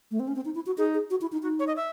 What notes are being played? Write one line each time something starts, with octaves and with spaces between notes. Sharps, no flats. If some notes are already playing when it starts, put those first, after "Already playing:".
A3
C4
C#4
C4
D#4
E4
F#4
D#4 G#4
G#4
F#4
E4
D#4
D#4 F#4
C#5
D#5
E5